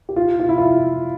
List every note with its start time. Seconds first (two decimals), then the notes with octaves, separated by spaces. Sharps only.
0.09 G4
0.16 F4
0.40 F4
0.49 E4
0.58 F4